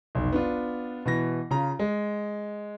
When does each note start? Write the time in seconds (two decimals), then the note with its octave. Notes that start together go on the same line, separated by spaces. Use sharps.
0.15 F1 B1
0.32 B3 D4 F4
1.05 B2 E3 A#6
1.51 C#3 F4 A#5
1.79 G#3